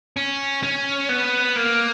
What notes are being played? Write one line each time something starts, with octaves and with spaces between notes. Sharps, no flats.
C#4
C#4
B3
A#3